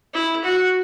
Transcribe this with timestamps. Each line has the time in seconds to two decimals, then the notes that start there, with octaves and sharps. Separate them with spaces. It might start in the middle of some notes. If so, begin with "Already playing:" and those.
0.14 E4
0.45 F#4